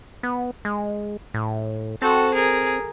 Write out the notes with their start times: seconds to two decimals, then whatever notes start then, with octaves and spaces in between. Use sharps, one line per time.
0.23 B3
0.65 G#3
1.34 A2
2.02 C4 F#4 A4
2.34 G#4 A#4